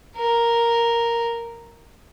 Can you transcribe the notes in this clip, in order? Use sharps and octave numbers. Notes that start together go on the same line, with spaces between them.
A#4